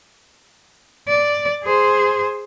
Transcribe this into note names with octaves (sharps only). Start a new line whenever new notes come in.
D5
G#4 C5